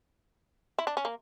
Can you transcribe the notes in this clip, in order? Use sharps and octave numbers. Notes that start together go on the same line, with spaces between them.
E4
D4
C#4
A#3